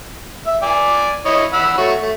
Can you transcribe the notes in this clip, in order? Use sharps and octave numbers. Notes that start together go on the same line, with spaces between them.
E5
D5 G#5
E4 C#5 D#5
F#5 B5 E6
A3 F#4 C#5
A3